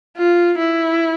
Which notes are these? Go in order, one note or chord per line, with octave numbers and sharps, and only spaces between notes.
F4
E4